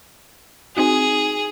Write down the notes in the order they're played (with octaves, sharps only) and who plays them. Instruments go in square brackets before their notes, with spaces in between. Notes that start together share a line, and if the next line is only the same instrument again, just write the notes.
[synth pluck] C4 D#4 F#4 [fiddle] G#4